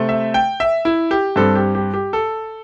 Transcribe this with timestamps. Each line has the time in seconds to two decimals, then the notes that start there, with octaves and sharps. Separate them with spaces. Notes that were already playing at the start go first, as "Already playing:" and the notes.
Already playing: C3 A3 C4
0.09 E5
0.34 G5
0.60 E5
0.85 E4
1.11 G4
1.36 G2 G3 C4 A4
1.56 G4
1.75 G4
1.94 G4
2.13 A4